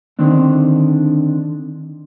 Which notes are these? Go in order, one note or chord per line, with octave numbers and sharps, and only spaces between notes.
D3 D#3 C4 D4